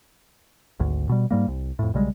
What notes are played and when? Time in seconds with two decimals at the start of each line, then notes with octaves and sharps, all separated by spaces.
0.80 G#1 D2
1.09 B2 G3
1.31 G#2 G3 A#3
1.48 C2
1.79 F2 A2
1.94 B1 C#3 G3 G#3